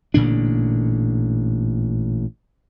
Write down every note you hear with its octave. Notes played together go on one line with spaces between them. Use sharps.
A1 A#2 D3 D4